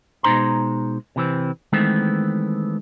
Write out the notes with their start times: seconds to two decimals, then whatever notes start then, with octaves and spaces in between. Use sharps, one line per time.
0.23 B2 G#3 D#4 C5 A#5 C6
1.16 C3 E3 C4
1.73 D#3 E3 G#3 A3 B3 C4